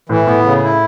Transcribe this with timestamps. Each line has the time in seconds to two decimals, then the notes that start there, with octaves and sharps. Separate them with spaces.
0.09 A2 E3
0.27 A2 B3
0.45 C#3
0.64 E4